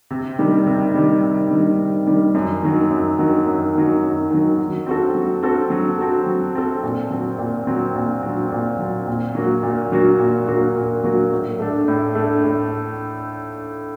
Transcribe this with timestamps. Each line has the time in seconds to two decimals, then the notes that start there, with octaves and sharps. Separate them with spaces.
0.10 C3
0.38 D#3 G3
0.66 C3
0.94 D#3 G3
1.22 C3
1.51 D#3 G3
1.78 C3
2.06 D#3 G3
2.34 F#2
2.62 D#3 F#3
2.90 F#2
3.18 D#3 F#3
3.47 F#2
3.75 D#3 F#3
4.03 F#2
4.30 D#3 F#3
4.58 F#3
4.86 C4 F#4 A4
5.15 F#3
5.43 C4 F#4 A4
5.70 F#3
5.98 C4 F#4 A4
6.27 F#3
6.55 C4 F#4 A4
6.83 A#2
7.11 F#3 C4
7.38 A#2
7.67 F#3 C4
7.95 A#2
8.23 F#3 C4
8.52 A#2
8.79 F#3 C4
9.07 A#2
9.35 F#3 A#3 F#4
9.63 A#2
9.92 F#3 A#3 F#4
10.20 A#2
10.47 F#3 A#3 F#4
10.75 A#2
11.03 F#3 A#3 F#4
11.32 A2
11.59 A3 D4
11.88 A2
12.15 A3 D4
12.44 A2